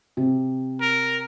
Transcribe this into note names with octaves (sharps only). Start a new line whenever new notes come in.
C3
A#4